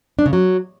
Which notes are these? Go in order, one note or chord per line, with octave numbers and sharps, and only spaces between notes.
D4
C#3
F#3